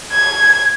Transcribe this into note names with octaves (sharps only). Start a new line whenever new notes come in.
G#6